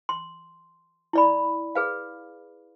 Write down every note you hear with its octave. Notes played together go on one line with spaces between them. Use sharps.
C6
E4 D5 B5
G#4 B4 F5